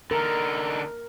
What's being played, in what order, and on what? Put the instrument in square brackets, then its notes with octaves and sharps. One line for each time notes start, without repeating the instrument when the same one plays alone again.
[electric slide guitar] D3 D#4 [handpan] A#4